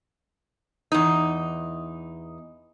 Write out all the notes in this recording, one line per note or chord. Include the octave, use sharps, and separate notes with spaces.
E2 D#4